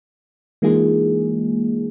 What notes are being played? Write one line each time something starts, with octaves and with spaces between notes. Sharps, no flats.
E3 G#3 A#3 D#4 F4 G#4